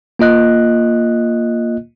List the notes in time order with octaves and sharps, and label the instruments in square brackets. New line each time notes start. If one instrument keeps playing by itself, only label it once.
[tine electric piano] A#3 F4 D#5 F#6